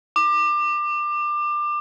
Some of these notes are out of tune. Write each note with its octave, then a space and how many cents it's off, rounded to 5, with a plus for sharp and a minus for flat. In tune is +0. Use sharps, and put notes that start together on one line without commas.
D6 +25